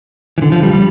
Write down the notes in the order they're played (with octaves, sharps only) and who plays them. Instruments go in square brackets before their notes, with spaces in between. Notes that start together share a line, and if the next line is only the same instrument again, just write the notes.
[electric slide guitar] E3
D3
F3
G3
G3